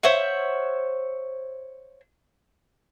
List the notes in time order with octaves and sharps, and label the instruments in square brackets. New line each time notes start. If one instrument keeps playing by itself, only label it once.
[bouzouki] C5 C#5 E5 F#5